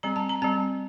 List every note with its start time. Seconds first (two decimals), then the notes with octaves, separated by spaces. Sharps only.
0.03 G3 C4 A#5
0.16 A5
0.29 A#5
0.42 G3 C4 A5